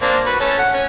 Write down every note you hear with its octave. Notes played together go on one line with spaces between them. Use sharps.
A#3 C4 D4
F#4 B4
A3 C#4 A4
F#5
C#4